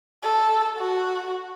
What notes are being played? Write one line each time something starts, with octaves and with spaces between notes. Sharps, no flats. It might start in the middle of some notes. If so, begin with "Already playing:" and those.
A4
F#4